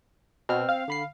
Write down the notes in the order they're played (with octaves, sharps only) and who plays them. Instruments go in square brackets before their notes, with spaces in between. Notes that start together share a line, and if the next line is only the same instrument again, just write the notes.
[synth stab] B2 [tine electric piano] C4 F6
[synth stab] F5
[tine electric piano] D3 B5 C7